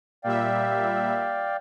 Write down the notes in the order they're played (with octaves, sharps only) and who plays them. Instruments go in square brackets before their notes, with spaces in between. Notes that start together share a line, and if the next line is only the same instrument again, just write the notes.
[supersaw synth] A#2 G3 E5 [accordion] D5 F5 G5